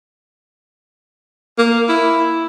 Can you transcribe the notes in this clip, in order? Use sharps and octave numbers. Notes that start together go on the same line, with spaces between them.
A#3
E4